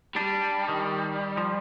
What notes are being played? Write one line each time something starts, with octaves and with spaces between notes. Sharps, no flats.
G3 D4
D#3
F3